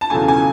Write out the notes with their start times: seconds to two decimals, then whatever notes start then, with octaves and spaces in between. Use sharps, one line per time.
0.01 A5
0.10 E2 C#3 F#3 A3 G#5
0.28 G#5